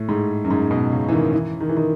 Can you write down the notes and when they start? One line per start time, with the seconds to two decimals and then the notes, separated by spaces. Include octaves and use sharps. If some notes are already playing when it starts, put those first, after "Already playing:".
Already playing: A2
0.09 G#2
0.45 F#2
0.51 G#2
0.71 B2
0.92 C#3
1.09 E3
1.13 D#3
1.34 E3
1.61 D#3
1.69 E3
1.77 D#3